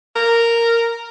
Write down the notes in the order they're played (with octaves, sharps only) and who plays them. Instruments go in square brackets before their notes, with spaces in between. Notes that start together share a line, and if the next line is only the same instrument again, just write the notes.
[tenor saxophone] A#4